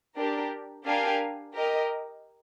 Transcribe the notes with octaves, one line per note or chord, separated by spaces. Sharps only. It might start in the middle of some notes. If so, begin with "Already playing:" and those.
D4 G4 A#4
D4 G4 A#4 F5 G#5
G4 A#4 D#5